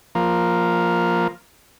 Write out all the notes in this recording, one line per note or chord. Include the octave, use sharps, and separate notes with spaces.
F3 A#3